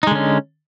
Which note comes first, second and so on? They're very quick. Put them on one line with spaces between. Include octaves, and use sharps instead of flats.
D#4 G#3 D3 C#4